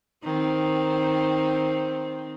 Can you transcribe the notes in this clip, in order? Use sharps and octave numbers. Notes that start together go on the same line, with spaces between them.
D#3 C4